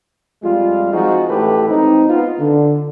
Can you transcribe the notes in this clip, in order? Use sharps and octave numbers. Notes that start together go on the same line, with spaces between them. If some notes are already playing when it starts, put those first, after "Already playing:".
F2 G3 G#3 F4
F3 G#3 C4 D#4 F#4
A1 A2 E3 G4 A4 B4
G#1 C4 D#4
B3 F4
D3